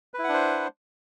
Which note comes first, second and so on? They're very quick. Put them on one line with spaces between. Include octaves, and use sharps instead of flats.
B4 E4 F#5 D4 C5